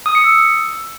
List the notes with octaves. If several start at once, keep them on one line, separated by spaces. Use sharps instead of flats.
D#6
C#7
E6